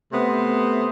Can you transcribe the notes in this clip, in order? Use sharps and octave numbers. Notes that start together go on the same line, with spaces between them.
C3 A3 B3 C5